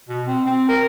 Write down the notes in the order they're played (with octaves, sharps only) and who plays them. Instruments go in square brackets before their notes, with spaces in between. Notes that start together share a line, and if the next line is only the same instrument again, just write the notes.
[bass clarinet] B2
C4
C4
A#4